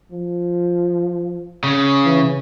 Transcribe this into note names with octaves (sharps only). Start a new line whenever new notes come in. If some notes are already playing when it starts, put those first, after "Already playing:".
F3
C#3
E3